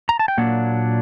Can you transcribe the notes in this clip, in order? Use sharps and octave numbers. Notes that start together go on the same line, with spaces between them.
A#5
A5
G5
A#2 F#3 A#3 D4 F#5